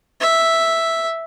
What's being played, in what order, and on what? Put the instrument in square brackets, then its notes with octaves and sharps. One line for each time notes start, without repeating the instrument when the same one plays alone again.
[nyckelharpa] E5